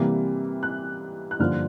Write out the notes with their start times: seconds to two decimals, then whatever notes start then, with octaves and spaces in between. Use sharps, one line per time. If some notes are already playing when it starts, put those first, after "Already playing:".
Already playing: C3 E3 G3 A#3
0.63 F#6
1.31 F#6
1.39 G2 D3 F3 A#3 F6